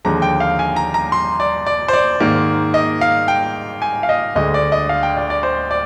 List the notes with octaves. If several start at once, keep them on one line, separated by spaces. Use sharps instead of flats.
D#2 D3 F3 G#3 A#5
G5
F5
G#5
A#5
A#5
C6
D5
D5
C5
D5
G#2 D#3 A#3
D#5
F5
G5
G#5
F5
D#5
D2 D3 G#3 D#5
D5
D#5
F5
G5
D5
D5
C5
D5